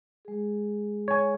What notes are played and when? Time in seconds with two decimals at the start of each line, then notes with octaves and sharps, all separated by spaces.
0.25 G#3 G#4
1.08 C#5 G#5